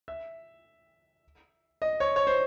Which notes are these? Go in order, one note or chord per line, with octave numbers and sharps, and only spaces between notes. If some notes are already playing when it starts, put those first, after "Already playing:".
E5
D#5
C#5
C#5
C5